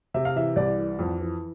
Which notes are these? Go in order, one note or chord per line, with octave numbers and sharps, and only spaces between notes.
C3 E5
F5
E3 E5
C2 D5
E3
F2
E3